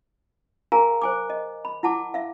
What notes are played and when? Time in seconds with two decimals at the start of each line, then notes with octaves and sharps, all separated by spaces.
0.72 G#4 A#4 F5 G#5 A#5
1.02 C5 G#5 D6
1.30 D#5
1.65 B5
1.83 E4 F#5 A5 D6
2.14 E5 F5